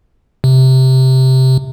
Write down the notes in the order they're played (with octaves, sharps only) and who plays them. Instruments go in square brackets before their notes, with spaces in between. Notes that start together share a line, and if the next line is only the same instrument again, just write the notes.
[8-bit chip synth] C3